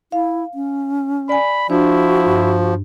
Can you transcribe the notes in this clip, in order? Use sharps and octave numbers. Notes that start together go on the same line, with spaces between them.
E4 F5
C#4
D5 G#5 B5
F3 D4 E4 F#4
G2